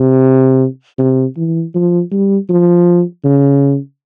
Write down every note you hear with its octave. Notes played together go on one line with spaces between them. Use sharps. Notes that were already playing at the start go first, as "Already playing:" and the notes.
Already playing: C3
C3
E3
F3
G3
F3
C#3